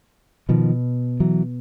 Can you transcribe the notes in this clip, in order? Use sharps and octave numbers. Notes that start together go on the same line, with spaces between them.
B2 D#3 F3
E3 F#3